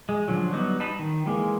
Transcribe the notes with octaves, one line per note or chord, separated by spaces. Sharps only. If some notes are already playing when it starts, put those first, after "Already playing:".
G#3
D3 F3 F#3
F#3 G3 B3 D#4 F#4
D#4 A5 B5
D#3
E3 G#3 A#3